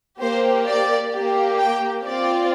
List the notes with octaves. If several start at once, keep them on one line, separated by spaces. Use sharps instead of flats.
A#3 G4 C5
D5
A#3 G4
G5
C4 F4 D5